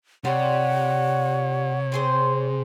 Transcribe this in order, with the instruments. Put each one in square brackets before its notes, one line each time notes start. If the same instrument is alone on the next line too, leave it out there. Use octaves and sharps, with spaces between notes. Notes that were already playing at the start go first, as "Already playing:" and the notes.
[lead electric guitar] C3 [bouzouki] G3 F4 [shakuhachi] C#5 [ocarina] F#5
[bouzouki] C4 G#4 C5